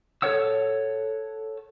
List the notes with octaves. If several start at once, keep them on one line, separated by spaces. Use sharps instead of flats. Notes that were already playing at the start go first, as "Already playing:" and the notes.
A4 C#5 F#5 E6